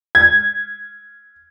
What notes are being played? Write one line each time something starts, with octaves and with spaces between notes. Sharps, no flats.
G#6